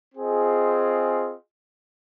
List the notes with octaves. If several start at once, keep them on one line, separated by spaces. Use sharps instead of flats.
C4 F4 G#4 D#5